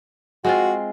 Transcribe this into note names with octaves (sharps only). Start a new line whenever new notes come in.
G#3 C4 F4 F#4